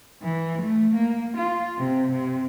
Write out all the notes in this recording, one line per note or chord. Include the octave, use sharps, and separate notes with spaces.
E3
A3
A#3
F4
C3
C3